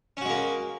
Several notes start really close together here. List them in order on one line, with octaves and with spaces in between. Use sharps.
C#4 F#4 G#3 A#3